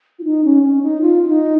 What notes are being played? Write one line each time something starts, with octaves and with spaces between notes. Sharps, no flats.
F4
D#4
C#4
C#4
D#4
F4
F4
D#4